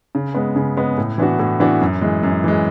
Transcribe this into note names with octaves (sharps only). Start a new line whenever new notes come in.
C#3
G#3 B3
C#3
G#3 B3
A2
E3 B3 D4 F#4
A2
E3 B3 D4 F#4
F#2
E3 G#3
F#2
E3 G#3